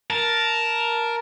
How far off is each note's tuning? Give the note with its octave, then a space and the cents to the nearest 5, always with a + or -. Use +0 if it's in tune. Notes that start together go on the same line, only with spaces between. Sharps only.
A#4 +5 A5 +0